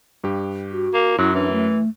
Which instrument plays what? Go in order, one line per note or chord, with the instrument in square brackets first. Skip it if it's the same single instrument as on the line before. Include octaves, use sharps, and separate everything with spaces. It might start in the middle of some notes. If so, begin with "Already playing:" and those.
[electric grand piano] G2 G4
[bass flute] F#4
[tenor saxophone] A#3
[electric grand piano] F#2 [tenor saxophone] F#3 [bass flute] E4
[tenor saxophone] E3 [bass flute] D4
[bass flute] A3